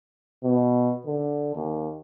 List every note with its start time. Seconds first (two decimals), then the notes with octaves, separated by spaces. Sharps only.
0.44 B2
1.06 D3
1.55 D#2